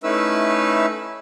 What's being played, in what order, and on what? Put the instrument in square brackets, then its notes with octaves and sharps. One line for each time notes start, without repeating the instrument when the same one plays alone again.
[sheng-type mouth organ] A3 C#4 D#4 E4 B4 E6